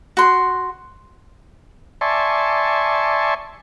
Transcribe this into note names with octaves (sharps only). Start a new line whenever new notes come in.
F#4 C6
D5 E5 G#5 A5 C6 C#6